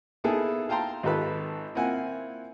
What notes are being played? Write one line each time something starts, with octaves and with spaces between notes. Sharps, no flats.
A#3 B3 D#4 E4 G#4 A4
F5 G5 A5 A#5 C6
G#1 F4 G4 A4 B4 B5
A#3 C4 E4 F4 F#5 G#5